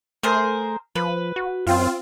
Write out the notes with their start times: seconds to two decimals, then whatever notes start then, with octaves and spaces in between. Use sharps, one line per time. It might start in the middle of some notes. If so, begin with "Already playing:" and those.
0.23 A3 G#4 A#4 C5
0.96 F3 B4
1.36 F#4
1.67 F#2 C4 F4